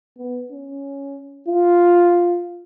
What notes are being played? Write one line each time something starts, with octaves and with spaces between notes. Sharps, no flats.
B3
C#4
F4